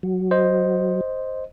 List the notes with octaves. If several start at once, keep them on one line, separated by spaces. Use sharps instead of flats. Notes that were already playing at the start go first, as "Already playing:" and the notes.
F#3
C5 D#5